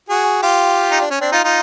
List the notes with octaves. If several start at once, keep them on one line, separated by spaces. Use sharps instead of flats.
F#4 G#4
F4 G4
D#4
D4
C#4
C4 D4
D#4 F4
D#4 F4